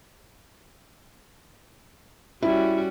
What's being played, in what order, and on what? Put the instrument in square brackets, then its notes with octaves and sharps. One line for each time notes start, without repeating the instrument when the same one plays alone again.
[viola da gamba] G3 C#4 F#4 [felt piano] E4